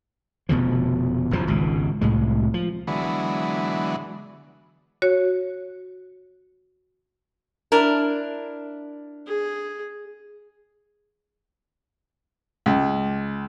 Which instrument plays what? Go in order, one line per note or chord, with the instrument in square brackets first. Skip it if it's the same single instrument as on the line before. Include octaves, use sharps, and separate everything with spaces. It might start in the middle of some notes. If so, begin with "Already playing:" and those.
[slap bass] F1 B2 D3 F3
F#1 E2 A2 F3
G#1 C#2 B2
C2 A2 G#3
F3
[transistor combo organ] D3 E3 F#3 G#3 B3
[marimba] F#4 C#5
[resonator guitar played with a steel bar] D4 E4 A#4
[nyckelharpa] G#4
[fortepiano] C#2